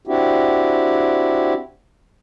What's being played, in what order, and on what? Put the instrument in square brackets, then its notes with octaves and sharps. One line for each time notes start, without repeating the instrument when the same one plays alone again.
[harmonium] C4 D4 E4 F#4 G4